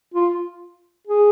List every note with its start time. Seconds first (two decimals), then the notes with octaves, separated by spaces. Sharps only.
0.14 F4
1.07 G#4